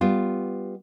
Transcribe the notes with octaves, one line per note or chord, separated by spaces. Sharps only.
G3 B3 F4